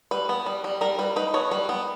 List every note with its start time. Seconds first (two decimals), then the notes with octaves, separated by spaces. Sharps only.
0.11 G3 B4
0.29 B3
0.46 G3
0.64 G3
0.81 G3 A#4
0.99 G3 B4
1.16 D#4 B4
1.34 B3 C#5
1.51 G3 B4
1.69 B3